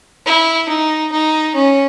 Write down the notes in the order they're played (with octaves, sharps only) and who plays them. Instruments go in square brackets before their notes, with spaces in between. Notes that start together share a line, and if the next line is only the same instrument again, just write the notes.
[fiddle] E4
D#4
D#4
C#4